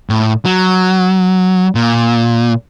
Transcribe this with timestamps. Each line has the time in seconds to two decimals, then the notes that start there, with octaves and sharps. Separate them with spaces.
0.10 A2
0.45 F#3
1.75 A#2